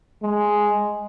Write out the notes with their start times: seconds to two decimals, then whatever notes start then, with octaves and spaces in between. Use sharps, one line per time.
0.23 G#3